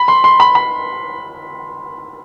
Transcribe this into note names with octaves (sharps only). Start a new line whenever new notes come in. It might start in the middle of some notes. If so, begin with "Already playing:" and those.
Already playing: B5
C6
C6
B5
B5